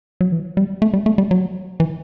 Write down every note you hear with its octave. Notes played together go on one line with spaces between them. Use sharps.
F#3
E3
G3
A3
G3
A3
G3
F#3
E3